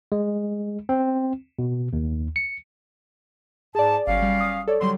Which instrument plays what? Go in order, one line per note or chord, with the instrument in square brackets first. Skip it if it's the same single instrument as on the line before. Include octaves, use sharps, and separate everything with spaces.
[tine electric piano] G#3
C4
B2
D#2
C#7
[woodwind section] G#2 A5 [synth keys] G#4 D5
[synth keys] G1 F#3 [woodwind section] C#4 D5 F5
[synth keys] G3
D#6
A4 C#5 D5
[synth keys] D3 F#3 G3 [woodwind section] C6